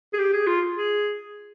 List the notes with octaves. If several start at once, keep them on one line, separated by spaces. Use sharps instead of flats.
G#4
G4
G#4
F4
G#4